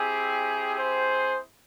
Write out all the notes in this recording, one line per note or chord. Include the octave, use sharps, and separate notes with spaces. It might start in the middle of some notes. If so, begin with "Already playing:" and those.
Already playing: C4 E4 G4 G#4
G#4 C5